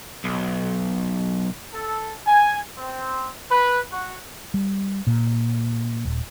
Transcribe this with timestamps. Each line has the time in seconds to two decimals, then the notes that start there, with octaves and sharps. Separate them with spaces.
0.24 B1
1.74 A4
2.27 G#5
2.78 C4
3.51 B4
3.92 F#4
4.54 G3
5.07 A#2
6.05 D#1